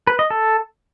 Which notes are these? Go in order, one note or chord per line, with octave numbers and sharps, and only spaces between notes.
B4
D#5
A4